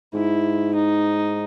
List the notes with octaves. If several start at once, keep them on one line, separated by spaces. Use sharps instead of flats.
G#2 E4
D#4